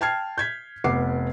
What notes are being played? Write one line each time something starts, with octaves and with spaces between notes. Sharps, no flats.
G5 A5 F6 G#6 C7
G6 G#6 B6
F1 B3 F#5 D6 C7